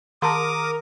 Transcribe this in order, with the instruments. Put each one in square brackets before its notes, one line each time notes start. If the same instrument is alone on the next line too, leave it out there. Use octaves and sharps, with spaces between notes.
[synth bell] D#3 [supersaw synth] A#4 [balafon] A5 A#5 C6 [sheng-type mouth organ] D6 D#6